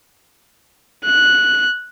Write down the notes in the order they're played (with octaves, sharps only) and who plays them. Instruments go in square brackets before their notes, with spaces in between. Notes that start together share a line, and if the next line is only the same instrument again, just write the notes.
[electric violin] F#6